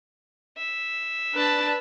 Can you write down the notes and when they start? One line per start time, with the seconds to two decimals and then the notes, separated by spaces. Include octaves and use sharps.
0.58 E5
1.35 D4 B4 A5